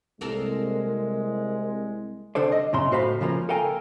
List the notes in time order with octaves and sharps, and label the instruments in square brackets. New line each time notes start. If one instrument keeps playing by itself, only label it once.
[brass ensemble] C2 G#3 [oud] A#3 A4 A#4
[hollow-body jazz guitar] C2 D3 D4 A4 C5 D5
D#5
B1 F#2 C#3 E4 A#5 C6
A2 F#4 C5 F5 G5 B5
C#3 F3 A3 A#3
A4 A#4 F5 G5 G#5 A#5